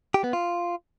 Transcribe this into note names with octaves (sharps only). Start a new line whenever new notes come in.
G4
B3
F4